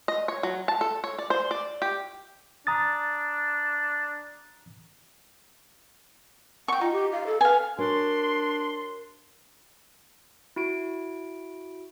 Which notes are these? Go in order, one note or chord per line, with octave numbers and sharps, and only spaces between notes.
D#5
C#5
F#3
A5
A4
C#5
D5
C5
D5
G4
D4 A#5 D#6 A6
F#5 G5 C#6
D#4 F4
G4
F5
A4
B4 F5 G#5
D4 F#4 A#4 C#5 C6
E4 F#4 D7